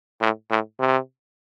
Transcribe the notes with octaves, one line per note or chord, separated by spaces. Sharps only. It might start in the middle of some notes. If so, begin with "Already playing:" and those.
A2
A2
C3